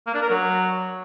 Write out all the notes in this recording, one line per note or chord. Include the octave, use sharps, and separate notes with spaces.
A#3
D4
A#4
F#3